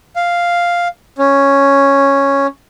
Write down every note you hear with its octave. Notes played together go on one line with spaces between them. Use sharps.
F5
C#4